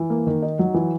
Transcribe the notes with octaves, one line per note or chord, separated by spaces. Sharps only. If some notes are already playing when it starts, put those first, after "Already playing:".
Already playing: E3
A#3
D#3
D#4
F#3
E3